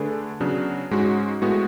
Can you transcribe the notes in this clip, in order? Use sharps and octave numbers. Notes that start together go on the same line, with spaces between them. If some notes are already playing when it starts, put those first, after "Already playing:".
Already playing: D3 A3 D4 G#4 B4
C#3 F#3 B3 D4
G#2 G#3 C#4 F#4
A2 G#3 B3 F#4